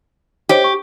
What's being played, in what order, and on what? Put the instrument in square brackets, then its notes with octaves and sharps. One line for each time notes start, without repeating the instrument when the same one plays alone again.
[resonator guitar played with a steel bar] G4 [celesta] C5 C#5 D#5
[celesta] C#6